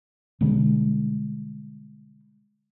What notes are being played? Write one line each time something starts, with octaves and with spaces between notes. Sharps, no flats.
B2 D3 G3 G#3